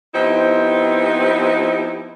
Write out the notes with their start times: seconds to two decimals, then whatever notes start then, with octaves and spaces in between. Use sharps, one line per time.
0.14 F3 B3 C4 D#4 E4 G4